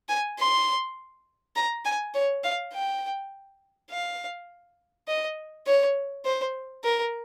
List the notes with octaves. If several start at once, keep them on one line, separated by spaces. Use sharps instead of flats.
G#5
C6
A#5
G#5
C#5
F5
G5
F5
D#5
C#5
C5
A#4